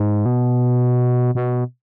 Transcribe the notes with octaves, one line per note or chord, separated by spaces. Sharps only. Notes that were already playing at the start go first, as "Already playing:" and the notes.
Already playing: G#2
B2
B2